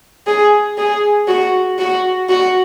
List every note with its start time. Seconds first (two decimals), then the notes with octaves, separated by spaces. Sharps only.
0.27 G#4
0.78 G#4
1.28 F#4
1.79 F#4
2.29 F#4